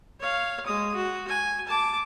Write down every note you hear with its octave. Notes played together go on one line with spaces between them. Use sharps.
C#5 F5
G#3 D#6
F#4
G#5
A5 D6